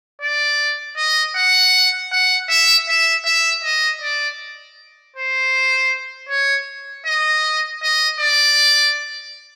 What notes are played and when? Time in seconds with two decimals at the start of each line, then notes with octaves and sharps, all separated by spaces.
0.22 D5
0.97 D#5
1.36 F#5
2.12 F#5
2.49 E5
2.88 E5
3.25 E5
3.64 D#5
4.02 D5
5.16 C5
6.29 C#5
7.06 D#5
7.82 D#5
8.20 D5